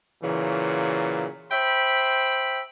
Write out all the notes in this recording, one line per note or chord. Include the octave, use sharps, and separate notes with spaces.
A#2 C#3 E3 F#3
C5 E5 G5 B5